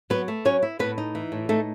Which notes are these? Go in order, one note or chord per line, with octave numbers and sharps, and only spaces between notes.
F#3 B3 B4
A3
F#3 C#4 C#5
E4
A2 B3 B4
D#4
E3
A2
A3 D#4 A4